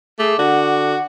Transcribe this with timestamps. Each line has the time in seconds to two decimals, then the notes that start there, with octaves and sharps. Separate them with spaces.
0.19 A3 G#4 D6
0.39 D3 F#4 F#5